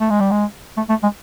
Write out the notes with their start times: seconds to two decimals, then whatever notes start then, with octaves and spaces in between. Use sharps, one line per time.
0.01 A3
0.10 G#3
0.20 G3
0.31 G#3
0.77 A3
0.89 A3
1.03 G#3